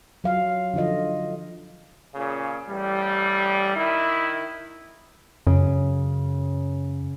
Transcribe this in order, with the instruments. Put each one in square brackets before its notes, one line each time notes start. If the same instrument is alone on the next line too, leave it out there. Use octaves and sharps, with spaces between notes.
[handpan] F#3 F5
D3 F3 F4 A4 D#5
[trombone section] A#2 C#3
A1 G3
D#3 E4
[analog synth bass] F#2 [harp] C#3